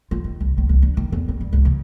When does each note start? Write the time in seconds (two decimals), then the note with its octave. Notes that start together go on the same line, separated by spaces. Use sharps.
0.11 F4
0.24 D#3
0.40 C2
0.58 C#2
0.69 C2
0.82 D4
0.97 D#3
1.12 E2
1.28 C4
1.41 G2
1.53 C#2
1.65 C#3